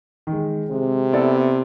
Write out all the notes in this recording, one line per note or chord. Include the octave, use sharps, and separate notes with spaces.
D#3
G#3
C3 G#3
B3 E4 A4 D5